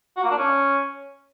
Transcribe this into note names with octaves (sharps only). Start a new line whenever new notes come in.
F#4
A#3
D4
C#4